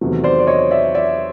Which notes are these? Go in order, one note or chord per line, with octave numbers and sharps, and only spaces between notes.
E2 C3 D#3 F#3 A3
C5 D5
D5
C#5 D#5
D5 E5
D5 E5